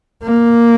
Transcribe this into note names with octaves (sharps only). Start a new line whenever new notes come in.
A#3